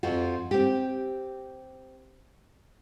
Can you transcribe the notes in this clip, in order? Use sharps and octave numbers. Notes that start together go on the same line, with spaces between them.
F2 F3 F4 F#4
C4 G4